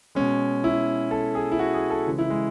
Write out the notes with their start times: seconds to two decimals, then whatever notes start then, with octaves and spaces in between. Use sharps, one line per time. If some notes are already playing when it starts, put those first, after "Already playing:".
0.15 B2 G#3 C#4
0.64 E4
1.11 A4
1.35 G#4
1.52 E4
1.59 F#4
1.74 G#4
1.90 A4
2.06 C#3 E3 G#3
2.18 E4
2.30 G#3